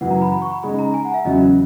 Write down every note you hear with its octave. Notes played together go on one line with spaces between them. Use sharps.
F#2 C#3 E3 F#5
A#5
B5
B5
C#6
B5
C#3 G#3 D#4 G#4 B5
A#5
G#5
F#5
E5
E2 C#3 F#3 C#4 D#5